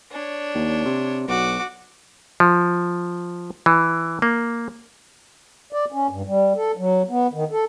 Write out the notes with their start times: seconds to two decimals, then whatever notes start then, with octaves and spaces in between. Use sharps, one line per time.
0.11 D4 C#5
0.55 D#2
0.85 C3
1.28 B1 F#4 D6
2.40 F3
3.66 E3
4.22 A#3
5.73 D5
5.92 C#4
6.10 G2
6.26 G3
6.56 A4
6.77 F#3
7.10 B3
7.33 D#3
7.51 A4